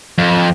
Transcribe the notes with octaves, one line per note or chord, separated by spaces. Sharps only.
F2